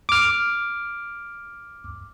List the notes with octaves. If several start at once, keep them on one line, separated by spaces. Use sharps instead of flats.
D6 F6